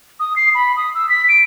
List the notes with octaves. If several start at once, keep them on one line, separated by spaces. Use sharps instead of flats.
D#6
C7
B5
D#6
E6
B6
D7